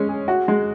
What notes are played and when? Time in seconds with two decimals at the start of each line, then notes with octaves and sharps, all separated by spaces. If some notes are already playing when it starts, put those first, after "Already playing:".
Already playing: G#3 C#4
0.09 G#4
0.28 F#4
0.48 G#3